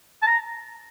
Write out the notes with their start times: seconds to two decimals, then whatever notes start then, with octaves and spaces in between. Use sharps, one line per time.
0.22 A5
0.27 A#5